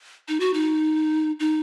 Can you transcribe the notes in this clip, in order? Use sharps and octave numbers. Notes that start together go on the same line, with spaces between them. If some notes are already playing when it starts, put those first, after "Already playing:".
D#4
F#4
D#4
D#4